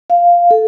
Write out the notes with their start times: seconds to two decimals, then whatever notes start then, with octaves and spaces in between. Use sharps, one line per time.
0.10 F5
0.51 A4